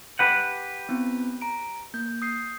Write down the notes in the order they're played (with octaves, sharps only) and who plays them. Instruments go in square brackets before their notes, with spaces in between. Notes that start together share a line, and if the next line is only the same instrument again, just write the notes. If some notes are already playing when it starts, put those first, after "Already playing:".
[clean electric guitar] G4 B4 F#5
[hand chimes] B3 C4 E4
A#5 D7
A#3 G6
D#6 G6 C7